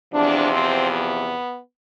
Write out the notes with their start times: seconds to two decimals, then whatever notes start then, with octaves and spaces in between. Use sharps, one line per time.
0.13 E2 C3 F3 D4
0.52 C4
0.90 B3